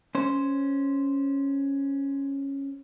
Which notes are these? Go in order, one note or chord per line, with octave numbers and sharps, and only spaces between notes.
C#4 C5